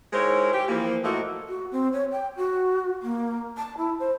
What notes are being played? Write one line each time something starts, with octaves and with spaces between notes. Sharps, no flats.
D#3 G#3 E4 A#4 C5 C#5
G4
E3 F3 A#3
A2 F3 A3 A#3 F#4 D#5
F#4
C4
C#5
G5
F#4
A#3
A5
E4
C5